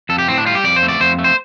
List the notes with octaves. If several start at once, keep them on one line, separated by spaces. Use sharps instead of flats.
F2 A4
G4
A2 C4
D4
G3 F4
G4
F2 D5
C5
A3
D5
F2 C5
A3
C5